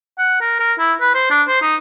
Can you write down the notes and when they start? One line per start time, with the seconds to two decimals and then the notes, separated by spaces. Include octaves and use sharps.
0.19 F#5
0.41 A#4
0.60 A#4
0.79 E4
1.01 B4
1.14 C5
1.30 D4
1.48 C5
1.62 D#4